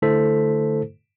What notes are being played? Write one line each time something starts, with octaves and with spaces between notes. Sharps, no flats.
D3 A3 E4 A4 C5 B6